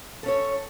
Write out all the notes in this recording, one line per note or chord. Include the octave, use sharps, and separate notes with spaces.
C#4 A4 C#5